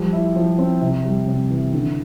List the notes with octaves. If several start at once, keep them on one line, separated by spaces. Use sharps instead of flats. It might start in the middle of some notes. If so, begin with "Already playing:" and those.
Already playing: F3 G3
E4
F3
C4
C3
G3
C3
E3
D3